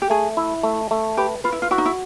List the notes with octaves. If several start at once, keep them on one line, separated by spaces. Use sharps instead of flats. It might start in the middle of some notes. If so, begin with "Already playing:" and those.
G4
A3 G#4
E4
A3
A3
G4 B4
F4 B4
E4
F4
E4 F#4
D#4
E4